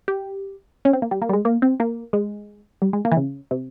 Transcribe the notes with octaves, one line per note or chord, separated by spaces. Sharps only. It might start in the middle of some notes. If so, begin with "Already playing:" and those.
G4
C#4
C4
A#3
G3
A#3
G3
G#3
A#3
C4
A#3
G#3
G3
G#3
A#3
E3
C#3
C3